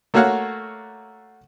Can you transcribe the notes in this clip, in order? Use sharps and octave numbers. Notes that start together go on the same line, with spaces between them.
A3 A#3 F#4 C#5 F5 F#5